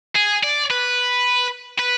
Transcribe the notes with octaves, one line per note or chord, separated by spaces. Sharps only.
G#4
D5
B4
B4